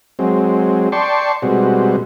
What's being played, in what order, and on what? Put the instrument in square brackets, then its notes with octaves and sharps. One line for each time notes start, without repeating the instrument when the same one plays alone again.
[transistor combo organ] F#3 G#3 C4
D5 G5 A5 C6 C#6
B2 G3 G#3 C4 F#4